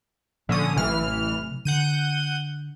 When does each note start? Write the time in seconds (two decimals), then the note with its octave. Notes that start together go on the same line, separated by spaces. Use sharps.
0.49 A#2 D3 F3 A#3 C#4 D#6
0.76 A1 C3 E3 F#3 A3 F6
1.65 D3 F#5 G6 D#7